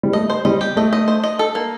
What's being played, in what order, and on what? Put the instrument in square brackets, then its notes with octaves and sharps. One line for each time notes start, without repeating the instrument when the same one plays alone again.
[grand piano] G3
[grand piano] A3 [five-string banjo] D#5
[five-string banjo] C5
[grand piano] G3 [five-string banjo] D#5
[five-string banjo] G4
[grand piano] A3 [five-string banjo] D#5
[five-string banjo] D#5
C5
D#5
A4
A#3